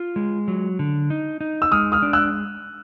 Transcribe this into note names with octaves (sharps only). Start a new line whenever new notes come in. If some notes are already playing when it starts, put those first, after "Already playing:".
Already playing: F4
G#3
F#3
D3
D#4
D#4
E6
G#3 D#6 F6
D#6 F6
D4
E6 F#6